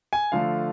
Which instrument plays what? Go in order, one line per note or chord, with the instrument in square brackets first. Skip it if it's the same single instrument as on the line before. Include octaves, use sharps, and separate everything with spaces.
[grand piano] G#5
D3 F3 A3 F5